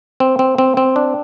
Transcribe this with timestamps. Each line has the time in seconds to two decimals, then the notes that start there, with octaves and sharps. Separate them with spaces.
0.20 C4
0.39 C4
0.58 C4
0.77 C4
0.96 D4